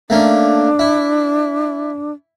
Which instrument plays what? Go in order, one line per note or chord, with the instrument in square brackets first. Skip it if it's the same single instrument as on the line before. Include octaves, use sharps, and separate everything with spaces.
[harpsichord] A3 A#3 C#4 [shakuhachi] D4
[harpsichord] E4